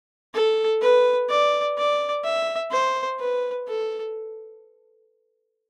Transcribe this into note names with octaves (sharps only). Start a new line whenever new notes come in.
A4
B4
D5
D5
E5
C5
B4
A4